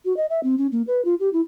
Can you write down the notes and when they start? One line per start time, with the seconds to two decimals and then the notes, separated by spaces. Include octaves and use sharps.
0.05 F#4
0.17 D#5
0.30 E5
0.43 C4
0.58 C#4
0.72 A#3
0.87 B4
1.05 F4
1.20 G4
1.33 E4